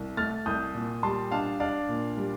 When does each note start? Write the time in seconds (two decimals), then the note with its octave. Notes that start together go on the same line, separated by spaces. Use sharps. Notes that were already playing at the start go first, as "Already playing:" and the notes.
Already playing: C2
0.17 A3 F6 A6
0.46 C2 D#6 G6
0.74 A#2
1.03 G3 A5 C6
1.31 D4 F5 A5
1.60 D4 D5 F5
1.89 A#2
2.17 G3